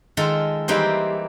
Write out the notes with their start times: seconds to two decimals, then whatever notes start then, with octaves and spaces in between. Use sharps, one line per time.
0.17 D#3 G#3 F4 A4 A5
0.68 E3 G3 A#3 C4 D#4 C5